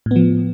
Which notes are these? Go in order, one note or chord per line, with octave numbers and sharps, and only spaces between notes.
A2 F3 B3